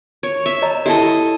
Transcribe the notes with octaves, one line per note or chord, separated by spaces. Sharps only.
C#5
E5
C#5 D#5 A#5
E4 G4 A4 D#5 A5